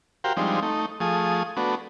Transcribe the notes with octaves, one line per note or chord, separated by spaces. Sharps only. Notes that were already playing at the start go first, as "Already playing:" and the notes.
F#4 G4 A#4 C5 F5 G5
F3 G3 G#3 C4 D4 D#4
A3 D#4
F3 A3 G#4 D#6
A3 B3 D4 F#4